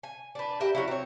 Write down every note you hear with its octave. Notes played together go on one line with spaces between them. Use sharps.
G#5
D4 B4
G4 A#4 B4 E5
F#3 C#4 E4
C4 C#5